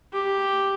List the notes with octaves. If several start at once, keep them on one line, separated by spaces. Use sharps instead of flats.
G4